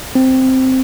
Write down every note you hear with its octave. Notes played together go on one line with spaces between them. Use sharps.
C4